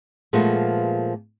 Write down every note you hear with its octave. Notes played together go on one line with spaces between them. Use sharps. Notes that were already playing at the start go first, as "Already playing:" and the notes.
A#2 F3 G#3 A3 B3